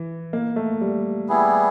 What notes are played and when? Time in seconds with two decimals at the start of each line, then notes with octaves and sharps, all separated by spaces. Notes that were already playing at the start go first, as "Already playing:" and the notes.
Already playing: E3
0.33 A#3
0.56 A3
0.81 G3
1.29 G3 B3 E4 G#4